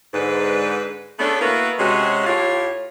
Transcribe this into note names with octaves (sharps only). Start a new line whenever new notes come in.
G#2 D3 B4
A3 B3 C#4 D4 G#4 A4
A#3 B3 E4 F#4 A#4 B4
C3 G#3 C#4 F#4
A2 F4 G4 C#5